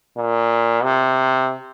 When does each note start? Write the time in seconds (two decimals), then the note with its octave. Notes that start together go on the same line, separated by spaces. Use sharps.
0.17 A#2
0.84 C3